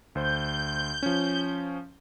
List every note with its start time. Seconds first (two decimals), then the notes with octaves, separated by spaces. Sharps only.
0.15 D2 C5 G6
1.03 F3 C#4